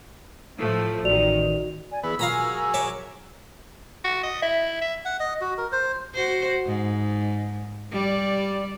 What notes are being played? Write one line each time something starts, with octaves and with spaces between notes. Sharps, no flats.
A2 F3 A3
A1 D#3 F#4 D5 F7
D5 G#5
E3 B3 G#4 B4 E6
F#3 F4 G#4 A#4 F5 A#5 B5
G#5
C#5 E5 D6
F#4
D#5
E4 E5
E5
F#5
D#5
F#4
A#4
C5
F#4 C5
G#2
G3 D5